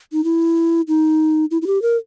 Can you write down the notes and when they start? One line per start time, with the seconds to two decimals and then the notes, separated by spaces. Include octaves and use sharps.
0.13 D#4
0.24 E4
0.88 D#4
1.51 E4
1.62 E4
1.67 G4
1.82 A#4